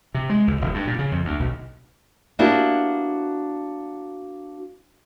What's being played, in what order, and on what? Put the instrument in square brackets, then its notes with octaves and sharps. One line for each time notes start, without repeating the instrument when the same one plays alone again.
[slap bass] C3
G#3
C#2
D#1
G2
A#2
C#3
F2
D2
B1
[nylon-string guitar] A#3 B3 D4 E4 F#4 G4